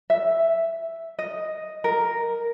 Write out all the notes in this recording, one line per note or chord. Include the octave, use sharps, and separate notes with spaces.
E5
D#5
A#4